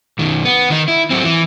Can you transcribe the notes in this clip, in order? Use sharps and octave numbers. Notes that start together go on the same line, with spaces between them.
B1 D#3
B3
D#3 D#4
E4
F#3 C4
E3